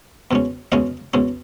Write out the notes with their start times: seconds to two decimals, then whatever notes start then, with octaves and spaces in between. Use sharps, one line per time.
0.31 E2 B2 G#3 C#4
0.72 E2 B2 G#3 C#4 D#5 F5
1.14 E2 B2 G#3 C#4